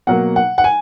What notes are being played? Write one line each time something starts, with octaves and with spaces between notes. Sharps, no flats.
B2 F#3 A#3 F#5
F#5
F#5
G#5